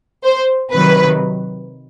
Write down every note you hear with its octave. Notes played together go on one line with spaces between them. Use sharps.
C5
C3 D#3 F#3 B4